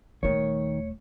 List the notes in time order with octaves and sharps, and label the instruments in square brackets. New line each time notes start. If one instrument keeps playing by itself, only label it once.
[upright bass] D#1 A3 [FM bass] D#3 [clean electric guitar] C#5